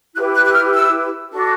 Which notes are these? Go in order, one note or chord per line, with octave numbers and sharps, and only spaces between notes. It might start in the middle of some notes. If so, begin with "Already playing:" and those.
E4 G4 B4 F#6
F#6
F#6
F6
E6
D4 F#4 A4